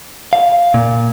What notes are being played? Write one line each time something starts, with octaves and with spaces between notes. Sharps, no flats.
F5
A#2